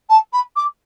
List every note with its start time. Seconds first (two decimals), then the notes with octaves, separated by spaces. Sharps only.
0.09 A5
0.32 B5
0.56 D6